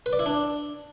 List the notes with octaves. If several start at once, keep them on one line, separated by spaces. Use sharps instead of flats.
B4
D5
E4
D4